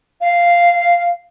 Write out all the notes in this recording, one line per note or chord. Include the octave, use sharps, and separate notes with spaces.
F5